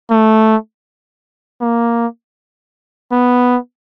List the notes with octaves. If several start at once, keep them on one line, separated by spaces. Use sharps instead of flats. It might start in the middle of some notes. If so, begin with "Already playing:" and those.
A3
A#3
B3